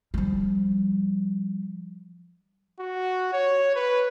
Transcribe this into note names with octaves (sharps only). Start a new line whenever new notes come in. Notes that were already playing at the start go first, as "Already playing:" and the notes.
F3 G3
F#4
C#5
B4